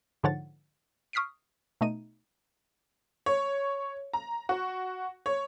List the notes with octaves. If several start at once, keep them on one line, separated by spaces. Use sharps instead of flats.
G#2 D3 F3 C#5 F#5 A6
C#6 D#6 F6 B6 C7 D7
B2 A3 D#4 D#7
C#5
A#5
F#4
C#5